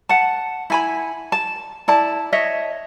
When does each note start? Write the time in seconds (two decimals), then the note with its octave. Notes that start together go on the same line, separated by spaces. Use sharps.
0.09 F#5 A5
0.70 E4 G#5 B5
1.32 A5
1.88 E4 D5 A5
2.32 C#5 D#5 E5